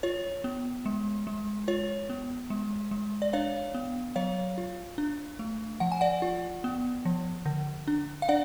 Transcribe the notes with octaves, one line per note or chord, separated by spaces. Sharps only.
F4 C#5
B3
G#3
G#3
F4 C#5
B3
G#3
G#3
D5
D4 C#5 F5
B3
F#3 C#5 F5
F4
D4
A3
F3 F#5
G#5
D5 F#5
F4
B3
F3
D3
D4
F5
D4 D5 F#5